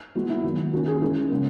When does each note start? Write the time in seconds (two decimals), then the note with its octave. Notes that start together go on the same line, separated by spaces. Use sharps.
0.15 E3 G#3 B3 F#4
0.30 E4
0.44 D#3 F#3 A#3
0.73 D#3 A#3 C#4 F#4
0.88 G#4
1.02 E3 G#3 C#4 A#4
1.30 C#3 G#3 B3